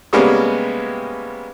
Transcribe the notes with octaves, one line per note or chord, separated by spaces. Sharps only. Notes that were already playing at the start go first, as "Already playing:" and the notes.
C3 G3 G#3 A#3 B3 C#4